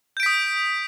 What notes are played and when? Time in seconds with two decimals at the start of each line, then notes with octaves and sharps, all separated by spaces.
0.17 G6
0.20 D7
0.23 B6
0.26 D#6